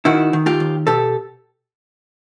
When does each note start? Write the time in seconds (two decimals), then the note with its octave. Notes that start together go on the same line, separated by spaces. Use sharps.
0.05 D#3 E4 F#4
0.33 D#3
0.46 F4 G4
0.60 D#2
0.87 B2 G4 A4